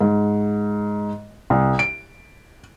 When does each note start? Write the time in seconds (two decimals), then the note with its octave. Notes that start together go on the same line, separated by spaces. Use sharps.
0.01 G#2
1.50 C2
1.79 D7